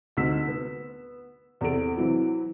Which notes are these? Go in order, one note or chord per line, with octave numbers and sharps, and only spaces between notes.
D2 C3 D#4 E6 B6
B3
E2 C3 A4 D7
E3 F#3 C4 E4